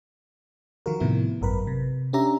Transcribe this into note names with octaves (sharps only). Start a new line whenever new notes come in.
D#3 F3 F4 F#4 A#4
A2 C3 D#3 F3 B3 E4
G#1 F#2 A#4 B4 B5
C3
C#4 D4 G4 E5 A#5